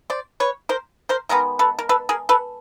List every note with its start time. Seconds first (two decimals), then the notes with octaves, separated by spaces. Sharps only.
0.10 C5 D5
0.40 B4 C#5
0.69 A#4 C5
1.09 A#4 C5
1.29 D#3 G#3 B3 A#4
1.59 A4 B4
1.79 A#4
1.89 A4 B4
2.09 G#4 A#4
2.29 A4 B4